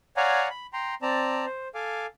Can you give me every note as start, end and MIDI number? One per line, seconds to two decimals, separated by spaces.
0.17 0.48 73
0.17 0.48 74
0.17 0.48 77
0.17 0.48 78
0.17 0.48 80
0.17 0.48 82
0.50 0.67 83
0.73 0.95 79
0.73 0.95 82
0.73 0.95 84
1.02 1.45 60
1.02 1.45 74
1.02 1.45 81
1.02 1.45 82
1.46 1.68 72
1.75 2.06 69
1.75 2.06 77
1.75 2.06 80
1.75 2.06 86